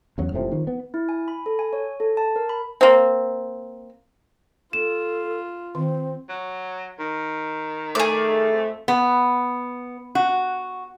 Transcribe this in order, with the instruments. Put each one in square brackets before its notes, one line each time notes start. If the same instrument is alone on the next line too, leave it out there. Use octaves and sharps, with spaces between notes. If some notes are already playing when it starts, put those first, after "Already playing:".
[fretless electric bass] E2 F#3 C#4
F#1 A2 C3 F3
D#3 F3
B3
[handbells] E4
G#5
B5
A4
G#5
C#5
A4
A5
A#4
B5
[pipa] A#3 C4
[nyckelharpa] F4 [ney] A4 [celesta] E7
[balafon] D#3 [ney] C4
[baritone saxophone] F#3
D#3
[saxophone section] A3 [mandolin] G#4 D5
[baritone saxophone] F2
[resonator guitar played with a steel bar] B3
F#4